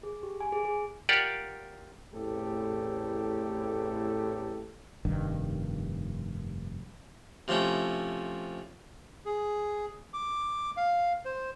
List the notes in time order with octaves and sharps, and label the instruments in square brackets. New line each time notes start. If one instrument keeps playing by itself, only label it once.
[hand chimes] G#4
G4
G#5
G#4
G#4
[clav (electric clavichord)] F4 G4 A#4 D5 F#5
[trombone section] A1 E2 A2 C4 G4 A4
[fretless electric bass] F1 G2 D#3
[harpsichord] C3 F3 A3 C#4 E4
[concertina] G#4
D6
F5
C5